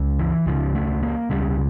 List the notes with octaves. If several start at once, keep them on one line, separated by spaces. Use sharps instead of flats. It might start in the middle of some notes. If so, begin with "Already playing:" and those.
Already playing: C#2 C#3
E3
C#2 C#3 F3
A3
A#3
C#2 C#3 G3